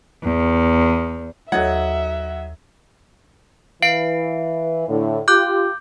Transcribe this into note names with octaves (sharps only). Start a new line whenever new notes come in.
E2
D#2 F#3 A4 C#5 D#5 E5 F#5 G#6
E3 B4 F5 C7 D7
A2 D3
F4 G4 D6 F#6 G6